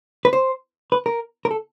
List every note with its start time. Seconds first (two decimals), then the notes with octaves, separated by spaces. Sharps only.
0.25 B4
0.33 C5
0.92 B4
1.06 A#4
1.45 A#4
1.51 A4